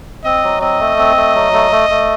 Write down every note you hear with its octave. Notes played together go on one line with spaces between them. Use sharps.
C4 D#5
F#3
C4 D#5
A3
C4
A3
F#3
A3
A3
A3